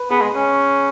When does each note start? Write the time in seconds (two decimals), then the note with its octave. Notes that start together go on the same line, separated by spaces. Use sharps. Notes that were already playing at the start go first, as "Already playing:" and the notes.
Already playing: B4
0.10 B3 G#4
0.21 G#3
0.34 C#4